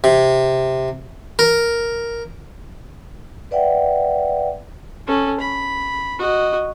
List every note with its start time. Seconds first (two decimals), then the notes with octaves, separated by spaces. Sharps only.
0.04 C3
1.39 A#4
3.51 B4 D5 E5 F#5 G5
5.07 C#4 A4
5.40 B5
6.19 F#4 D#5